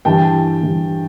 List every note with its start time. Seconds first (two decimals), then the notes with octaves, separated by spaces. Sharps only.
0.05 G2 E3 G3 G5 A5
0.62 G2 E3 G3